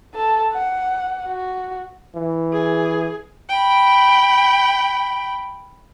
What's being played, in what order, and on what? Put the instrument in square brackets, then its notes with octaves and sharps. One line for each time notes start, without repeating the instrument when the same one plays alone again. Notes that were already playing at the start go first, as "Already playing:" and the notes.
[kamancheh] A4 A5
F#5
F#4
[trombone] E3
[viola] G#4
[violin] G5 B5